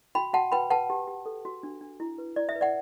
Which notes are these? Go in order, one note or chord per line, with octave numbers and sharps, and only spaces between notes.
F#4 G5 B5
F#4 F#5 A5
B4 G5 B5
B4 F#5 A5
G4
G4
A4
F#4
D4
D4
E4
B4
E4 D5
E5
B4
D5 F#5